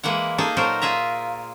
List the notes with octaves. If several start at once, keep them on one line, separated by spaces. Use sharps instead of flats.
E3 G#3 A#3 E4 F#5
A#3 D#4 G#4 A4
A#2 F#3 A4 A#4 C5
F4 G#4 E5 A#5